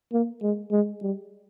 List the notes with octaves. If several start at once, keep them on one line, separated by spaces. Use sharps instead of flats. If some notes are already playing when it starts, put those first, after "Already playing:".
A#3
G#3
G#3
G3